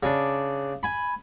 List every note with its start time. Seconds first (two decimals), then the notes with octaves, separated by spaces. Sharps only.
0.03 C#3 D4
0.83 G#5 B5